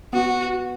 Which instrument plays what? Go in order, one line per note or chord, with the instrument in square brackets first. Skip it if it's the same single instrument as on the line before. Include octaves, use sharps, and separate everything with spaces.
[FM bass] B3 [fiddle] F#4